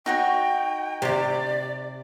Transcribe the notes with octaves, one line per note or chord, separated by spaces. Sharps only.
D#4 F#4 C#5 G5
C3 G4 D5